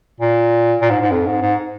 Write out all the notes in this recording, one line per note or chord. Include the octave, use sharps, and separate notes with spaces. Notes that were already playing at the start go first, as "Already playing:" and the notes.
A#2
A#2
G#2
G#2
F2
G#2
G#2